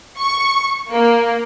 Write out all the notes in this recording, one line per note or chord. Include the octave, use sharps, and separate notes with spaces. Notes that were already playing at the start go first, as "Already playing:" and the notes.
C#6
A#3